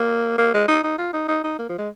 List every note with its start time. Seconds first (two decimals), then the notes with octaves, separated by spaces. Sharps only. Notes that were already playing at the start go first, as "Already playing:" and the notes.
Already playing: A#3
0.38 A#3
0.54 G#3
0.68 D#4
0.83 D#4
0.98 F4
1.13 D#4
1.28 D#4
1.44 D#4
1.59 A#3
1.69 F3
1.79 G#3